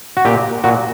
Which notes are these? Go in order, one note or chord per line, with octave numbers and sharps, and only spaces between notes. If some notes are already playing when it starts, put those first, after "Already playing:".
F#4
A#2 G4
A#2 F#4